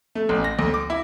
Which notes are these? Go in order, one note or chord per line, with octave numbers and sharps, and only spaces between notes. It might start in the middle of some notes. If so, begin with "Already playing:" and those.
A3
A1
A#6
D2
D6
E4